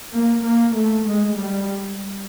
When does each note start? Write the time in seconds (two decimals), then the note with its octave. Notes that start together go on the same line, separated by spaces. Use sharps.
0.13 A#3
0.44 A#3
0.76 A3
1.08 G#3
1.39 G3